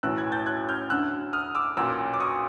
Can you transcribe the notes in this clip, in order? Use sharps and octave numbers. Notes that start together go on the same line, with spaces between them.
B1 A2 E3 E6 F#6
F#6 G#6
G6 A6
F#6 G#6
F6 G6
D2 D3 E6 F#6
D#6 F6
D6 E6
B1 A#2 D6 E6
D6
C#6 D#6